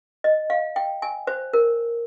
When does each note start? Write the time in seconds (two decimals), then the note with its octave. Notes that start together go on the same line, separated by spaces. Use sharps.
0.24 D#5
0.50 F5
0.76 G5
1.02 G#5
1.27 C5
1.53 A#4